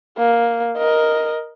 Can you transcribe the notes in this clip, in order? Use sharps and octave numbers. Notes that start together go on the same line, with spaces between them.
A#3
A#4 D#5